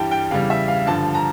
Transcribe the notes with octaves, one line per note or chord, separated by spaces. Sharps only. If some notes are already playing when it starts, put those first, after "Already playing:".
Already playing: G2 E3 G3 G5 A5
G5
E2 C#3 G3 F5
E5
F5
G2 D3 F3 A5
A#5